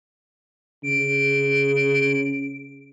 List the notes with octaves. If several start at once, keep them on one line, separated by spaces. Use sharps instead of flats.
C#3 D7